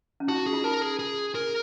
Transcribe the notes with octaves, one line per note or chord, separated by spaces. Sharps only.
C#4
D#4 F#4
G#4
F4
D#4 A#4
G#4
G#4
A#4